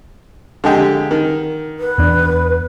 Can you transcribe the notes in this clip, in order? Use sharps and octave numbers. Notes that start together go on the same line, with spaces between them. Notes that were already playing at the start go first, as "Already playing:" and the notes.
D3 G#3 G4
D#3
B4
E2 D4